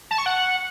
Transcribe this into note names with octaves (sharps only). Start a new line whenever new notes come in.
A5
C#6
F#5